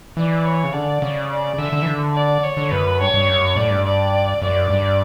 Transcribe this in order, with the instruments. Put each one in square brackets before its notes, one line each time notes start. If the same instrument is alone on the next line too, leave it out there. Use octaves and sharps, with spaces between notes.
[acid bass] E3 [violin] D5
[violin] C#5
[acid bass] C#3
[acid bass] D3 [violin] D5
[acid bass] C#3
[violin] D5
[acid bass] D3 [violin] E5
[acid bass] D3
E3
D3
[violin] D5
C#5
[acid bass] D3
[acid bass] F#2 [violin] B4
[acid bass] G2 [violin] C#5
[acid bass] G2
F#2
[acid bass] A2 [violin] D5
[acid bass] G2
[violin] D5
[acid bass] F#2 [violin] D5
[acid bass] G2